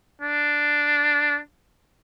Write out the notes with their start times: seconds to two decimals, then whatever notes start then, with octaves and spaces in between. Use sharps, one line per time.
0.22 D4